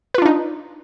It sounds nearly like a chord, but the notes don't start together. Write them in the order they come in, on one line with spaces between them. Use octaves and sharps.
B4 F4 D4 D#4